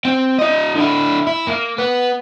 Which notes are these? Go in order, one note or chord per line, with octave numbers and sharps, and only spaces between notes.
C4
E4 D#5
D3 E4
E4
A#3
B3